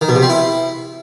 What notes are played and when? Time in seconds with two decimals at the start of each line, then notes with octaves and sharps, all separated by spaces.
0.01 D#3
0.08 B2
0.15 C3
0.22 C4
0.30 E4